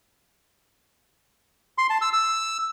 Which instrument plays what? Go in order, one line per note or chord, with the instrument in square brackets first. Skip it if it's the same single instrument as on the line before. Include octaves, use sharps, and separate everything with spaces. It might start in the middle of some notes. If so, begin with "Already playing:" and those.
[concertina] C6
A5
E6
E6